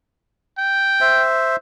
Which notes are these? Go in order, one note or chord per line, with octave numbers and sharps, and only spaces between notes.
G5
C5 E5